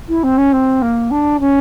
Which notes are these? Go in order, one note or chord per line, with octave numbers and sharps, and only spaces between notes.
E4
C4
C#4
C4
A#3
D4
C#4